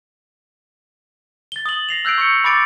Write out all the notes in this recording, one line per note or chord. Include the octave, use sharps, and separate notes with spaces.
A6 G7
D#6 F#7
A#6 C7 F7
E6 F#6 G6 C7 D7
C#6 G6 C#7
B5 D6 A6 D7